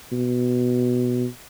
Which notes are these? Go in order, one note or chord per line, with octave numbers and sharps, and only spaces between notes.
B2